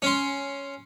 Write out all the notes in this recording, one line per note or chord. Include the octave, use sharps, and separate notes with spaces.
C#4 C6